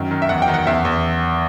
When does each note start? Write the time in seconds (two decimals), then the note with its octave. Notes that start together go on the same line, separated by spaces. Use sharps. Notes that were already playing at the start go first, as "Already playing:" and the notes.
Already playing: F#2 D#3
0.11 D#3
0.22 E5
0.29 E2 F#5
0.42 G5
0.48 D#3
0.54 F#5
0.67 E2 E5
0.85 E2